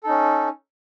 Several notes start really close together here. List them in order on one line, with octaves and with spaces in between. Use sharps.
A4 D#4 C#4